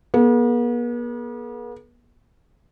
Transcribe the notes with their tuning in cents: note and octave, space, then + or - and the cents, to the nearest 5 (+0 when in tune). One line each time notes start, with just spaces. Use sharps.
B3 -45 G#4 +45